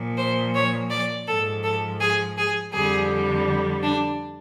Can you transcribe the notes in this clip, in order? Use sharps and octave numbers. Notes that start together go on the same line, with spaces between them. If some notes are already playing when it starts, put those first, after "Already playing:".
Already playing: A#2 F3
C5
C#5
D5
G#2 F3 A4
A4
G#4
G#4
F2 D3 G3 G#4
D4